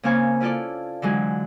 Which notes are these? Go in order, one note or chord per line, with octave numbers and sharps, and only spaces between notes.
C#3 A#3 C4 F5 G#5 C#6
C#4 E4 F4 A4 D5
D3 E3 F#3 G#3 G#4